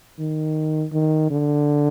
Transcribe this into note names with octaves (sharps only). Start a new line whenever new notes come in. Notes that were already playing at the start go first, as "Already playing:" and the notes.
D#3
D#3
D3